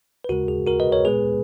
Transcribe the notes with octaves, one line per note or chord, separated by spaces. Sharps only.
B4
D#2 C#3 G#3 F#4 A#4
G#4
F#4 A#4
B4 D#5
A#4 C#5
A#2 G#3 B3 G#4 B4